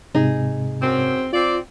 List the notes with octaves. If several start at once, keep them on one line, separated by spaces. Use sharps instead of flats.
G#2 C3 D#4 G#4
F#2 C4
C4 F4 D5